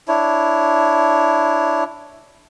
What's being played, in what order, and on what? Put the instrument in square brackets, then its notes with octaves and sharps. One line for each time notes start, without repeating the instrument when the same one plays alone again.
[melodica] D4 E4 C#5